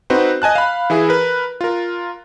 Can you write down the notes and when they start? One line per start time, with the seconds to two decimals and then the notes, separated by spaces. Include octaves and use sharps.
0.10 C4 D#4 F#4 B4 C5
0.42 D#5 G#5 A5 F#6
0.55 F5 B5
0.90 E3 E4 G#4
1.09 A#4 B4
1.61 F4 A#4